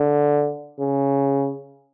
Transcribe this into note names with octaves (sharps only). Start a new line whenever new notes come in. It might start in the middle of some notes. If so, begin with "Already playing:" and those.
Already playing: D3
C#3